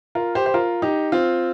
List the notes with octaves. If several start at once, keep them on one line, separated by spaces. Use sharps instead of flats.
F4 A#4
G4 C5
C5
F4 A#4
D#4 G4
C4 F4